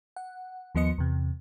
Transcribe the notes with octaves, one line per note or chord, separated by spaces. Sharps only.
F#5
D#2 F3 B3 D#5 C#7
E2 C3